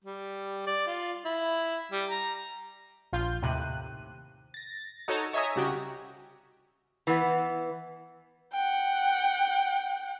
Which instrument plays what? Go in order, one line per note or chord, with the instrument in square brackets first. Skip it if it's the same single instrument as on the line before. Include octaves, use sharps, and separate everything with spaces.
[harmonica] G3
D5
F4
E4
G3
A#5
[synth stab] A#1 F4 G6
D#2 A2 C3 F#6 D#7
A6 A#6
D#4 F#4 A4 C#5 A5 A#5
C#5 D#5 E5 G#5 A#5 D#6
C2 C#3 F#4 G4
[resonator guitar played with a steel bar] E3 B3
[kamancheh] F#5 G5